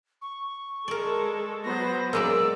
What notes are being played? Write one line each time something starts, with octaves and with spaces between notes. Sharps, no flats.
C#6
G#3 A4 A#4 D5
F#3 B3 C5 A#6
F#3 G#3 A#3 D5 E6